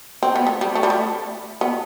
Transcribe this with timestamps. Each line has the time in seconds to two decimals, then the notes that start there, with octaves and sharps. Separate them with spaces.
0.23 C4
0.36 B3
0.47 A3
0.61 G3
0.75 A3
0.83 G3
0.90 A3
1.61 B3